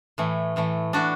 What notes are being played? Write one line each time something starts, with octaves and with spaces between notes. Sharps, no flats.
A2 E3 A3
A2 E3 A3
A2 E3 A3 D4 F#4